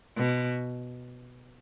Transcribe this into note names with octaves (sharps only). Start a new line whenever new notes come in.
B2